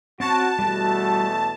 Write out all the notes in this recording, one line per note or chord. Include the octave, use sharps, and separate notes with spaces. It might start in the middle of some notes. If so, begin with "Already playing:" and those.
C4 F#4 C#5 A5 A#5
E2 B2 G3 A3 F#4